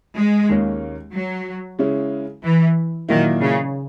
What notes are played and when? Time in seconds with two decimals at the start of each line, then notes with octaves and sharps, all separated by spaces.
0.17 G#3
0.49 D#2 D#3 A#3 C#4
1.14 F#3
1.79 C#3 G#3 C#4 E4
2.44 E3
3.09 A#2 D#3 F#3 A#3 E4
3.41 C#3